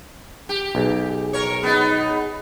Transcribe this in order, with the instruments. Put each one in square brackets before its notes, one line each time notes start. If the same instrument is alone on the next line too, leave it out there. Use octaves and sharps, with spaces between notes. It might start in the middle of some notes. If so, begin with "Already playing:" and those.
[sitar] G4
[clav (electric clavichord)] B1 [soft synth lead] G#4
[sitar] A#4 C#5
B3 D#4